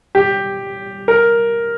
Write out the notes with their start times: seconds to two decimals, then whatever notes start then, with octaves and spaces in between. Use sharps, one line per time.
0.15 G4
1.08 A#4